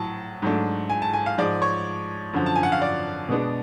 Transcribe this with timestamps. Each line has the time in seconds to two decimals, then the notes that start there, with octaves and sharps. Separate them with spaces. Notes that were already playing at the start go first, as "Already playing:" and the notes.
Already playing: A2 F#3 A5
0.42 G#2 F#3 A3 D4
0.90 G#5
1.02 A5
1.13 G#5
1.26 F5
1.38 G#2 F3 G#3 D5
1.62 C#5
2.33 F#2 D3 F3
2.46 A5
2.56 G#5
2.63 F#5
2.72 F5
2.82 D5
3.29 B2 G#3 B3 D4